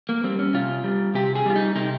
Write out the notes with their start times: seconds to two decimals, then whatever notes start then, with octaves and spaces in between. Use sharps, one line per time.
0.09 A#3
0.24 G3 C4
0.39 C#4
0.54 C3 F4
0.84 G3
1.14 C3 G4
1.35 G#4
1.45 G3 F4
1.56 D#4
1.75 C3 D#4